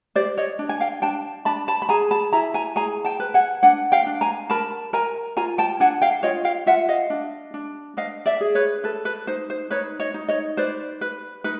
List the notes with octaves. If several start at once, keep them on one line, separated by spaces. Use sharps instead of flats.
G4 C5 D5
C#5 D#5
D4
G#5
F5 G5
D4 G5 A5
D4 A5 B5
A5 B5
B5
G#4 G#5 A#5
A5 B5
E4 G#5 A#5
G#5 A#5
G#4 G#5 A#5
G5 A5
B4
F#5 G#5
D4 F#5 G#5
F5 G5
D4
G#5 A#5
A#4 A5 B5
A#4 G#5 A#5
F4 G#5 A#5
G5 A5
D4 F#5 G#5
F5 G5
F4 C#5 D#5
F5 G5
F4 E5 F#5
D#5 F5
D4
D4
D4 D#5 F5
D5 E5
G#4
B4 C#5
A4 B4
B4
D#4 C5
C5
D#4 B4 C#5
C#5 D#5
D#4
C#5 D#5
B4 C5 D5
B4
D#4 B4